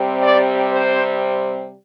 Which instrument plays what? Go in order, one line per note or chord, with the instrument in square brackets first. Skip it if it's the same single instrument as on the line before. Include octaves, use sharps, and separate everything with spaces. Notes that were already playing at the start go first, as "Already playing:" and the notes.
Already playing: [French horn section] C3 G3 C4
D5
C5